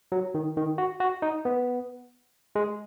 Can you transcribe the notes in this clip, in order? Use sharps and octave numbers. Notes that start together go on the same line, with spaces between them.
F#3
D#3
D#3
F#4
F#4
D#4
B3
G#3